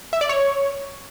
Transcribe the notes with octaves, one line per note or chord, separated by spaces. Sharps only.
E5
D5
C#5